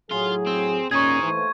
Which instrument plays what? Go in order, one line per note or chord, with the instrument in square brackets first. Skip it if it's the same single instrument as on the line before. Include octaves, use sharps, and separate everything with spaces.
[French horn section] A2 F#3 [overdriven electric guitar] F4 [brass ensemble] G#4
[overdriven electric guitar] C4
[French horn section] D#2 A#2 C#4 [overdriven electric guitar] D#4 G#4 [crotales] C#6 G#6
[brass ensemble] D#2 A3 C5 [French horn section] E3